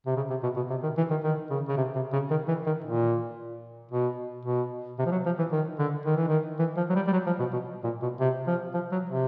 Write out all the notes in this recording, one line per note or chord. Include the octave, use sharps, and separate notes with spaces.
C3
C#3
C3
B2
B2
C3
D#3
E3
D#3
D#3
C#3
C#3
C3
C3
C#3
D#3
E3
D#3
A#2
B2
B2
C3
F3
F#3
F3
E3
D#3
D3
D#3
E3
D#3
E3
F3
F#3
G3
G3
F#3
F3
B2
B2
A#2
B2
C3
F3
F3
F#3
C3